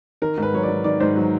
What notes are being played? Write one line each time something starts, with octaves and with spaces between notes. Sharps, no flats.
D#3 A#4
G#2
B4
F#3 C#5
D5
G#2
D#3 D5
G#2 C5
F#3